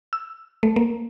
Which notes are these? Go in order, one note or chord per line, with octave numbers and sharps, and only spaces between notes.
E6
A3
A#3